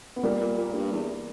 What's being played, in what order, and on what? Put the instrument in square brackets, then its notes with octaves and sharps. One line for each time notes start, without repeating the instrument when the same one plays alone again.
[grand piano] B3
[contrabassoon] A#2 [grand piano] G3 A#3
[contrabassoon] A#2
A#2
G2
E2